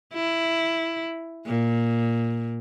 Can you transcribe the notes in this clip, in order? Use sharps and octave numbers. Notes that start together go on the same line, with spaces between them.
E4
A#2